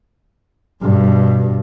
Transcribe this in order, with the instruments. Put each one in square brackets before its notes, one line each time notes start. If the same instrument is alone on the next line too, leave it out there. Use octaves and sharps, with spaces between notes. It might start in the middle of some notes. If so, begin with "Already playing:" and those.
[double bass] G2 B2